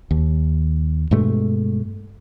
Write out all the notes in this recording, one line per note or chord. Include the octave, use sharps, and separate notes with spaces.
D#2
G2 B2 G#3 A3